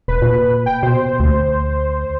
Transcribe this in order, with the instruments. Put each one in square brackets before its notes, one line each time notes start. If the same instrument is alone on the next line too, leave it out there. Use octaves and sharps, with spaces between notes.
[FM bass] E1 [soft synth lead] B4
[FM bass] A#2
[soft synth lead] G5
[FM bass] B2 [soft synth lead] C5
[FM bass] D2